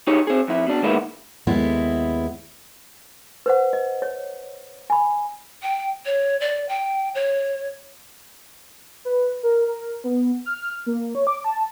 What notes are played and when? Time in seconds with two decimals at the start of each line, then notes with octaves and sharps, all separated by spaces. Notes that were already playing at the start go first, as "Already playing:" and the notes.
0.07 D#4 G4 G#4 C#5
0.27 C4 G#4
0.48 F2 E4
0.67 B2 D4
0.83 D#3 G#3 A#3 B3 E4
1.47 D#2 G#3 B3 E4
3.46 B4 C5 F#5
3.73 D#5
4.02 C#5
4.90 G#5 B5
5.62 G5
6.06 C#5
6.41 D5
6.69 G5
7.15 C#5
9.05 B4
9.43 A#4
9.67 A#4
10.04 B3
10.46 F6
10.86 A#3
11.15 C#5
11.27 D6
11.44 A5